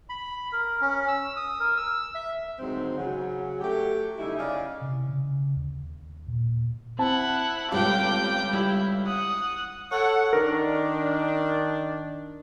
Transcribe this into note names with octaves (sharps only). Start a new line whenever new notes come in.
B5
A#4
C#4
E6
D#6
A#4
E6
E5
D2 G#2 D#3 F#3 C4
C#3 F#3
F#3 A3 G4
C#3 G3 A3 D#4 E4
C#3 C#4 E4 D5 D#5 F5
C3
C#3
D#2
A#2
C4 E4 F#5 A5
G1 C#2 G2 G5 D6
G3 E4
F#5 D#6
A4 C#5 F#5
D#3 D4 A#4